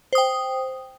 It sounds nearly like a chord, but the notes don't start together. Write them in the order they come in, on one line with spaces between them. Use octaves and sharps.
C5 D#6 G5